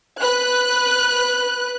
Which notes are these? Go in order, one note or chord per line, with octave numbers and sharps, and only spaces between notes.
B4 F#6